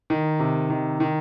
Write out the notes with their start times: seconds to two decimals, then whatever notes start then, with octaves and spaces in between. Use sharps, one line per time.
0.10 D#3
0.39 C3
0.70 D#3
1.00 D#3